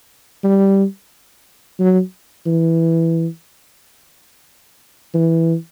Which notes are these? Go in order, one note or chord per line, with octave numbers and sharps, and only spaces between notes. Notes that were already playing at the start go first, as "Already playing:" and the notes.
G3
F#3
E3
E3